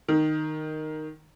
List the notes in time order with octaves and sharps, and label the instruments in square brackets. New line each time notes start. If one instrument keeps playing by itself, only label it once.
[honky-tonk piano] D#3